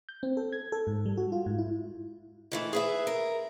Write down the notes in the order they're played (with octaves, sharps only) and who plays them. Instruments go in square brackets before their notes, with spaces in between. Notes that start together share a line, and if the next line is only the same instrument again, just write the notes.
[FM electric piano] G6
C4
A4
G#6
A4
G#2
G3
F#4
F4
G#2
E4
[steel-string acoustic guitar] D#3 E3 A3
G#4 B4 E5
A#4